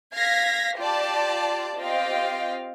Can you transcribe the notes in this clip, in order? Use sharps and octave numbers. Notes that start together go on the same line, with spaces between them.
F5 G#6 A#6 B6
F4 G4 D5 A5
C4 F4 G4 D#5 F5 G5